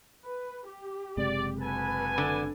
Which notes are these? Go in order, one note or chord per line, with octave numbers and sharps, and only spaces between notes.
B4
G4
F#1 C3 G#3 D5
D2 A4 B4 G#5
D3